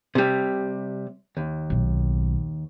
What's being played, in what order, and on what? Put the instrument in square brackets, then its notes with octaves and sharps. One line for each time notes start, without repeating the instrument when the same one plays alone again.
[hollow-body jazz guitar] C3 G3
D#2
[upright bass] B1 B2